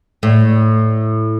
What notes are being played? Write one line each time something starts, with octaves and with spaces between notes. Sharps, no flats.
A2